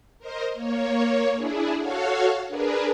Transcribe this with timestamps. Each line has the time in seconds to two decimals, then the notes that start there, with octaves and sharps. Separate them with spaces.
0.19 A#4 C5 D#5
0.54 A#3 C#5
1.35 D4 E4 G#4
1.78 F#4 A4 C#5 F5 F#5
2.48 D4 G#4 A#4 B4